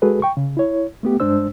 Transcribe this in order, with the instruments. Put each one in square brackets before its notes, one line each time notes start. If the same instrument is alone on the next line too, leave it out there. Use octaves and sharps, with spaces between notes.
[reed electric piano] G#3 F#4 G#4 A4 B4
G5 C#6
C#3
E4 C#5
A3 B3 G4
G2 G#3 D4 C5 E6